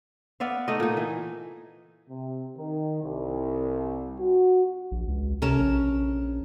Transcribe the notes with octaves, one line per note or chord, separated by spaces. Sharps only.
B3 D5 E5 F5
A3 D#4 D5 D#5
A#2 D#4
E3
C3
D#3
C2
F#4
A#1
C#2
C3 C#4 A#4 A5
A#1